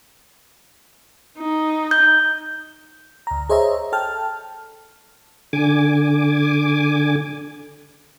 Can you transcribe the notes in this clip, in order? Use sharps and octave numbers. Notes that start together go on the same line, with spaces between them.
D#4
G6
D2 A#5
G#4 C5 C#5 D#5 E5 A#5
A4 G5 A5 F6
D3 G#5 D6